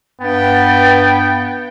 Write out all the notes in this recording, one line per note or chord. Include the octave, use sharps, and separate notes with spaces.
G2 B3 G5 A6